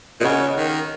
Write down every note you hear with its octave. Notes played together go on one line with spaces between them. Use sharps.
A#2 D#5
C#3 F#5
C#5
D#5
D#3
A#4